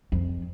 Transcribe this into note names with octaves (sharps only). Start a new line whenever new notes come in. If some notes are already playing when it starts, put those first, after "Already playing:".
F2